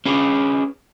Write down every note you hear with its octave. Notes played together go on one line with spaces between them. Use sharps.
C#4 G#4 B4